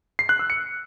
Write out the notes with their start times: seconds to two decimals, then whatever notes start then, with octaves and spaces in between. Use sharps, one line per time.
0.19 C7
0.29 F#6
0.39 E6
0.50 C#7